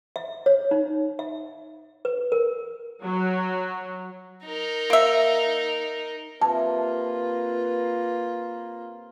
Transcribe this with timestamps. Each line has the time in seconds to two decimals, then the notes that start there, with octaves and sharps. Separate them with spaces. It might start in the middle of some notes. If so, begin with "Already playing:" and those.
0.16 E5
0.46 C#5
0.71 D#4
1.19 E5
2.05 B4
2.32 A#4
3.03 F#3
4.45 D#4 A#4
4.90 A#3 E5
6.42 C3 A#3 F4 B4 E5 A5